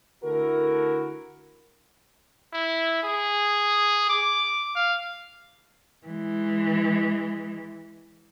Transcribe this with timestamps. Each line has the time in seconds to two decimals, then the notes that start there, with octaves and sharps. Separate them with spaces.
0.23 D3 A3 E4 F#4 A4 A#4
2.53 E4
3.04 G#4
4.10 D6
4.76 F5
6.07 E3 G#3